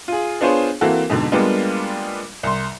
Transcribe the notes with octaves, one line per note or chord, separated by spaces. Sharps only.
F4 G#4
B3 D4 F4 G#4 C5 C#5
E3 A#3 C4 F#4 A4
F2 G#2 B2 D3
G3 G#3 A#3 B3 D4 F4
C2 C6